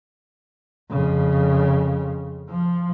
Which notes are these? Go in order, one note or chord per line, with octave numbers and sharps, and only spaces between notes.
F2 C#3
F3